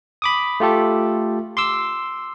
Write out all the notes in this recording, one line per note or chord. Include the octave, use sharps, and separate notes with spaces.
B5 D6 D#6
A3 F4 G4 A4
C6 D6 E6